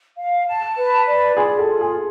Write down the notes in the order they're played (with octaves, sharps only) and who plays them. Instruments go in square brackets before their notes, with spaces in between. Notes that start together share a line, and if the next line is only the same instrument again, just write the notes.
[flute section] F5
A5
B4
D5
[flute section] F4 [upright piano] G#4
[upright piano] A4
[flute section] F4
[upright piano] G#4